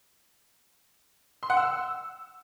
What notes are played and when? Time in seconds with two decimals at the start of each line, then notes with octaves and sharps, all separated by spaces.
1.43 C6
1.50 F#5
1.57 E6